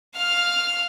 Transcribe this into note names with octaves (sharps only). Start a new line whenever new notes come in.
F5 F6